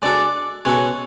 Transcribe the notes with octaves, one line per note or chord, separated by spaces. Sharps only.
G#3 D4 F#4 A4 D5
B2 G#3 C#4 F#4 A4 C#5